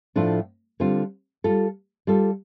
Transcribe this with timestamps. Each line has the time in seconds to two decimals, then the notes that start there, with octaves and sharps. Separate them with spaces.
0.16 A2 F3 A3 D4 F4
0.80 D3 G3 C4 F4
1.44 G3 F4 A4
2.07 G3 F4 A4